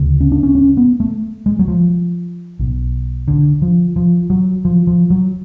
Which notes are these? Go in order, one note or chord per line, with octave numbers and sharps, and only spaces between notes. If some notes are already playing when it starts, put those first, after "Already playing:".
Already playing: D2 C#3
C#4
D4
C#4
C#4
B3
A3
G#3
F#3
F3
B1 B2
D3
F3
F3
F#3
F3
F3
F#3